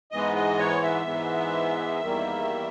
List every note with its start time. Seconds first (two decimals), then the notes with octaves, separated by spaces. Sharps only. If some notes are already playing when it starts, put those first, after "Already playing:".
0.12 G#2 E3 G#3 B3 D#5
0.36 D#5
0.59 C#5
0.83 E5
1.06 G#2 E3 G#3 B3
2.01 E2 D#3 G3 A#3